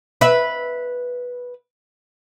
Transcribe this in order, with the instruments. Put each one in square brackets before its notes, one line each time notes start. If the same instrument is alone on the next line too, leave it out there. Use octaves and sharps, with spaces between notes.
[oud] B4 E5